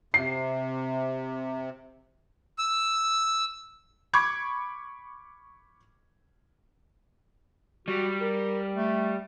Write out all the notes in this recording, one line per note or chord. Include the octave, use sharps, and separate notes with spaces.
C3 C7
E6
B5 C#6 D6 G#6
G3 F#4
A#4
A3